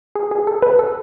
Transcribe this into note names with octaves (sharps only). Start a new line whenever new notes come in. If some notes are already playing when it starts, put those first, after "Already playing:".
G#4
G#4
A4
B4
A4